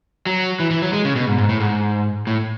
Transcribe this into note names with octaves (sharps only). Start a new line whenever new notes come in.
F#3
E3
E3
F#3
G#3
C#3
B2
G#2
G#2
A2
G#2
A2